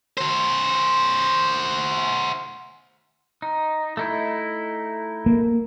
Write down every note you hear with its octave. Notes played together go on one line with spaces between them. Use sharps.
F#4 C5
D#4
A3 D#4 E4
A#3